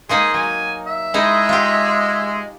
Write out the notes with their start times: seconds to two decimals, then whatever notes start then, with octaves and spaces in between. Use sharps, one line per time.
0.09 G#3 A#3 D#4 G#4
0.34 F#3 G#5
0.87 E5
1.14 G#3 D#4 E4
1.49 F4 G4